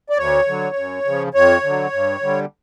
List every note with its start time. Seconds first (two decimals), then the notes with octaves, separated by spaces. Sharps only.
0.10 D5
0.17 D2 C#5
0.47 D3 F#3
0.76 F#2
1.06 C#3 F3
1.34 F2 C#5
1.64 D3 F#3
1.93 G2
2.22 D3 G3